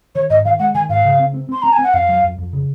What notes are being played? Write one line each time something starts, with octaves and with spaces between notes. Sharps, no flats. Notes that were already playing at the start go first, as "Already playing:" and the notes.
D#3 C#5
G#2 D#5
D#3 F5
G#3 F#5
D#3 G#5
G#2 F5
C#3
C4
C4
C4 C6
C4 A#5
G#5
C4 F#5
F2 F5
F#3
F2
F2
C#3